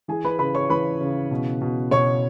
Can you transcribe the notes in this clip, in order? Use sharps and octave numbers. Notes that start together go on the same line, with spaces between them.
E3 G#4 G#5
B4 B5
C#3 B4 B5
C#5 C#6
E3 B4 B5
C#3
B2
B2
B2 C#5 C#6